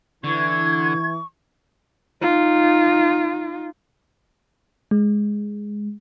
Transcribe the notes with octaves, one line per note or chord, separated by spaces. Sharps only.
D3 E3 C#6 G#6
D#4 F4
G#3